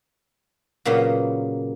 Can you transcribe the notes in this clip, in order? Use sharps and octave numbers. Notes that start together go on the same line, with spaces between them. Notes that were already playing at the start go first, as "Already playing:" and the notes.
A#2 C#3 F#3 A#3 B3